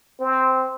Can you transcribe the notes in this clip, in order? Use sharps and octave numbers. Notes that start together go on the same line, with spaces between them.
C4